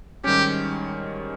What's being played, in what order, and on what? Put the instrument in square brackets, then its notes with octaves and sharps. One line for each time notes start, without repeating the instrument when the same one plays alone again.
[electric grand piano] G#2 D#3 G3 C#4 [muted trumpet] G4